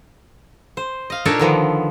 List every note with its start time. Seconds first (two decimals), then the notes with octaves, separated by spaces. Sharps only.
0.77 C5
1.10 D#5 F5
1.25 A#2 D4 D#4 A4 C#5 A5
1.39 D3 D#3 F3 B3